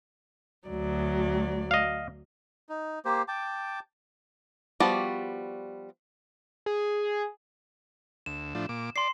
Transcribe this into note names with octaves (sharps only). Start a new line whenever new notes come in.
D2 F#3 D5
D#5 F5
D#4
A#3 G4 C5
G5 A5 D6
F3 G3 B3 F#4 D5
G#4
D2 E7
A2 F3 D4
A#2 D6
D5 C6 C7